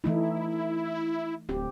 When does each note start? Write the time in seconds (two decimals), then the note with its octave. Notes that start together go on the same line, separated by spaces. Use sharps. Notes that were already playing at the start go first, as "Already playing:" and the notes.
0.04 E3 A3 D#4 E4
1.49 D1 C4 G4